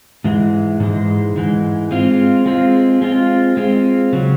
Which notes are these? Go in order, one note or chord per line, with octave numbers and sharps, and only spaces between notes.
G#2 E3 G#3
G#2 E3 G#3
G#2 E3 G#3
G#3 C4 F4
G#3 C4 F4
G#3 C4 F4
G#3 C4 F4
C#3 F#3